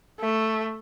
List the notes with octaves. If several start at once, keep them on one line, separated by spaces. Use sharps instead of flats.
A3